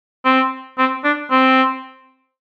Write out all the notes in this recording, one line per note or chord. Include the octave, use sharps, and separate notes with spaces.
C4
C4
D4
C4